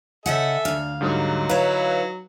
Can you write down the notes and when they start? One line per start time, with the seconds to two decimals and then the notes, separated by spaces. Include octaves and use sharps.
0.26 C#3 A4 D#5 E5 F#5 G#5
0.65 D2 D4 F5
1.01 G#2 D3 F#3 G3 D#4
1.49 E4 B4 C#5 F5